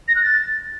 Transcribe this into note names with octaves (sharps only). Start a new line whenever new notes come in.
A#6
F#6
A6